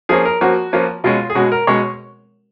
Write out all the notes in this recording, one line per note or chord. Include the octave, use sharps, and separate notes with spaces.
F3 A#3 C#4 G#4
A#4
F3 A#3 C#4 F#4
F3 A#3 C#4
B2 G#3 C#4 F4
G#4
B2 G#3 C#4 F#4
A#4
B2 G#3 C#4 C#5